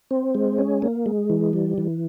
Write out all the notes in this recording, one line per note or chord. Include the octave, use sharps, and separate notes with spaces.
C4
G#3
C#4
A#3
G#3
E3
G3
E3